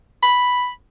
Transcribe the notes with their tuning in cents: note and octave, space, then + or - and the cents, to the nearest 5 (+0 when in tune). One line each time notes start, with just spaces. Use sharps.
B5 +0